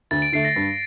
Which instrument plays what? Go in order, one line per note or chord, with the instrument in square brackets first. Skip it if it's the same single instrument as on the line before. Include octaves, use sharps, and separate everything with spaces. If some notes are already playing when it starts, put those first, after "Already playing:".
[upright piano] D2 [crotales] A6
[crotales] D7
[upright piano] D3 A3 [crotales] C7
[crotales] A#6
[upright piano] G2